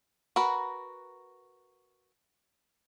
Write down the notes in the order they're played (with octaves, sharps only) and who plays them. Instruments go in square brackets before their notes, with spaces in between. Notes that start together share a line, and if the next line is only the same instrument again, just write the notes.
[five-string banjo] F#4 A#4 B4